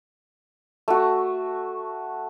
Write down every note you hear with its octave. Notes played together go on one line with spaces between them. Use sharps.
A3 F#4